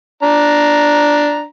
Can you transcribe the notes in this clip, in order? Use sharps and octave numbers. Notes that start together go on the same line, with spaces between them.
D4 A#5